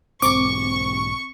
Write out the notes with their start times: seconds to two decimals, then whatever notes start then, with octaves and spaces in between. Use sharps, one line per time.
0.22 B1 G#2 C4 C#6 D6